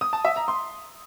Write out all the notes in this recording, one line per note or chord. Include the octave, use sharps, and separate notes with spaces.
D#6
A5
E5
A#5
C6